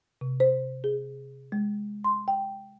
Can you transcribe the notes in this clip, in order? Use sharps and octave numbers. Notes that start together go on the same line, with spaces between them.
C3
C5
G#4
G#3
C6
G5